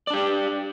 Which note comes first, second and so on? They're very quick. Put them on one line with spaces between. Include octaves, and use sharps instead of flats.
D5 D4 G4